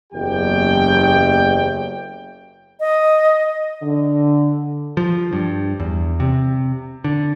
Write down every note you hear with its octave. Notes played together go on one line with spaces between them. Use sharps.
F#1 E2 G4 G5
D#5
D3
F3
G2
E2
C3
D3